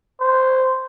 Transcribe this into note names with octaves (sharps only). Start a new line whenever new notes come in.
C5